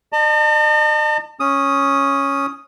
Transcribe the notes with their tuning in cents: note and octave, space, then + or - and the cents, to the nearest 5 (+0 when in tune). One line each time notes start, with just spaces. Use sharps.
D#5 -45 A5 +30
C#4 +0 D#6 +0